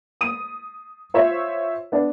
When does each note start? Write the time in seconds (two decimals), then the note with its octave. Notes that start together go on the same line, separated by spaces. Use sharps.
0.21 D#6 D#7
1.14 F4 C5 C#5 E5
1.92 B3 D4